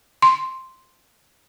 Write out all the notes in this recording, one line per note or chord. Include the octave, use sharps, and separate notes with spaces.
C6